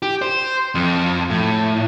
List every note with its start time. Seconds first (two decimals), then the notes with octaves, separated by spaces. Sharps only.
0.02 G4
0.22 C5
0.75 F2
1.30 A2